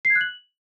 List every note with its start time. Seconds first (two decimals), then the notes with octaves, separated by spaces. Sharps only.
0.05 C7
0.10 G#6
0.15 F#6
0.21 F#7